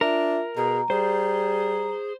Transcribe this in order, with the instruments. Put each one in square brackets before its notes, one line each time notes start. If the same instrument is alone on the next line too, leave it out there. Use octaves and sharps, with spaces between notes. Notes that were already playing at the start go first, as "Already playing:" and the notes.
[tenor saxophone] D4 [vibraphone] F4 E5 [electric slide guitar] A#4
[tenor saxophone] B2 [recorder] G#4 [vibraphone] A#5
[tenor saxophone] G3 [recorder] G#4 [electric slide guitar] C5